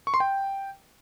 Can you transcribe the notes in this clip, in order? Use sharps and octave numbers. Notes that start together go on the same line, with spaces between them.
C#6
C6
G5